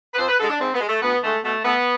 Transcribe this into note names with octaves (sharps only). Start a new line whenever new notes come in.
B4
F2 C5
B4
D3 G#3 A4
D4
G#2 C4
B3
G#3
A3
D2 B3
D3 G#3 A3
B2 A3
A3 B3